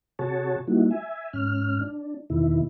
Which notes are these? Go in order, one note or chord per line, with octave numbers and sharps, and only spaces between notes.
C3 F#4 G#4 C#5 A5
G3 A#3 D#4 E4 F#4
E5 G#5
G#2 C#4 F6
D4
E2 B2 D#3 E4